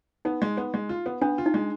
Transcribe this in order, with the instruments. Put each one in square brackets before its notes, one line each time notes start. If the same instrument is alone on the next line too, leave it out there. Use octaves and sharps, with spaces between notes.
[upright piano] B3 [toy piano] D#4
[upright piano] G#3
B3
G#3
F4
B3
[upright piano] B3 [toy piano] D4
[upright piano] F4
[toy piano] D#4
[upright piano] G#3